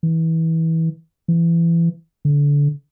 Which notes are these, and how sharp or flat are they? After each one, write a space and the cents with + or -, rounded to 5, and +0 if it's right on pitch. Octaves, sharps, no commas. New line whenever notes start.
E3 -25
E3 +25
D3 -25